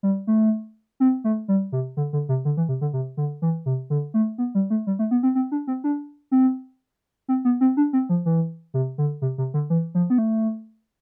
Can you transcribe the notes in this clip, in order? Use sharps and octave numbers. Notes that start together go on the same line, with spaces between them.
G3
A3
C4
A3
G3
C3
D3
D3
C3
D3
E3
C3
D3
C3
D3
E3
C3
D3
A3
B3
G3
A3
G3
A3
B3
C4
C4
D4
C4
D4
C4
C4
B3
C4
D4
C4
F3
E3
C3
D3
C3
C3
D3
E3
F3
B3
A3